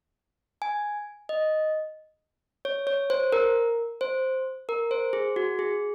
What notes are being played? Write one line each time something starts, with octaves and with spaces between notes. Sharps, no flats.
G#5
D#5
C#5
C#5
C5
A#4
C5
A#4
C5
G#4
F#4
G#4